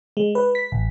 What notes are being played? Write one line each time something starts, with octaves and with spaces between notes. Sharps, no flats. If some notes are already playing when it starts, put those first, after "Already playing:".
G#3
B4
B6
A1